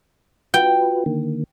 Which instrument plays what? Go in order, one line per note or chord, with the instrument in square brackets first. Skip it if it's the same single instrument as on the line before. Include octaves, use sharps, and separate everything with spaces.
[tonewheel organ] F4 F#4 B4 [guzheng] G5
[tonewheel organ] D3 D#3 A#3